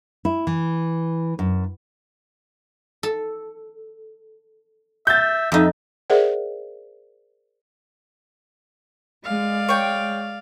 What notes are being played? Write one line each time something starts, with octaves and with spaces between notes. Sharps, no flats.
E4
E3
F#2
A4
E5 G6 A6
F2 D#4 E5
G#4 A#4 C5 D5 E5 F#5
G#3 D5 F5
C#5 G5